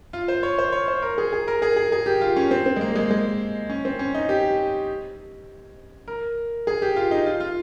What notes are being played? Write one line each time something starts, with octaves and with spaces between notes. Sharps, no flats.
F4
C5
C#5
C5
C#5
C5
A#4
G#4
G#4
A#4
G#4
G#4
G#4
G4
F4
C#4
C4
C4
G#3
A#3
G#3
G#3
C#4
C4
C#4
D#4
G4
A#4
G#4
G4
F4
D#4
F4
F4